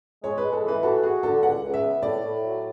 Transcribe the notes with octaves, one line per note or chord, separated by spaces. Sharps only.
G#3 C#5
B4
G#3
A4
E3 B4
F#4 A4
F#4 G#4
D3 A4
C#2 F#5
C#2
E5
B3
A2 D5
A2
F#3